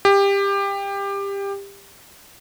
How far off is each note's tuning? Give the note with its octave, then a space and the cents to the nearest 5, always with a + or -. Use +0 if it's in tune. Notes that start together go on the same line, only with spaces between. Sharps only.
G4 +20